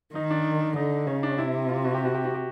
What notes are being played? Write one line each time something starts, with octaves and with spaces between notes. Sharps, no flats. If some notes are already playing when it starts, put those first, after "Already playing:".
D#3 D#4
D4
D3 D#4
C#3 C#4
D4
C3 E4
F4
F#4
G4
F#4
G4
F#4
G4